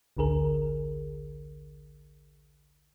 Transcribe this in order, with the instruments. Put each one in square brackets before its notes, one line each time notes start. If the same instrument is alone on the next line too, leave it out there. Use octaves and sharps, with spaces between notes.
[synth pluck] A1 D2 D3 G#4 A#4